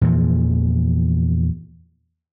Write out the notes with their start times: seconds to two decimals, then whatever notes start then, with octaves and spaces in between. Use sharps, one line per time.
0.01 E2 A#2 E3 F3